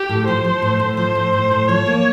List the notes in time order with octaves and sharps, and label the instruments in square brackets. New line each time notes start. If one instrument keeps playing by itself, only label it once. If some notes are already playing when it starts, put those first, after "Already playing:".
Already playing: [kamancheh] G4
[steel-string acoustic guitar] A2
[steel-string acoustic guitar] F3 [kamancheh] C5
[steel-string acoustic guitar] F3
A2
A2
[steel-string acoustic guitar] F3 [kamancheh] C5
[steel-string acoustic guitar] A2
A2
A2
[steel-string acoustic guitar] F3 [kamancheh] C#5
[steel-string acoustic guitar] A#3